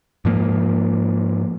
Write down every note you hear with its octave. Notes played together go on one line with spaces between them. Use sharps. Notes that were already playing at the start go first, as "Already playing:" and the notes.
G#2 F3 A#3